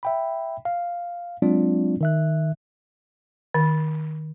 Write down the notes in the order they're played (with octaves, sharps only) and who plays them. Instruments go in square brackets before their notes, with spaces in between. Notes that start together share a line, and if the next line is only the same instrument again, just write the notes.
[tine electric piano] E5 G5 B5
F5
F#3 G#3 C4 D4 F4 D5
D#3 E5 F#6
[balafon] D#3